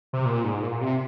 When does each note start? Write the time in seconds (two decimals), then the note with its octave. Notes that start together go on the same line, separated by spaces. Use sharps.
0.13 C3
0.25 A#2
0.44 G#2
0.62 A#2
0.81 C3